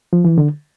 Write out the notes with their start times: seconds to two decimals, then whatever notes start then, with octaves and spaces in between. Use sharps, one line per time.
0.13 F3
0.25 E3
0.38 D3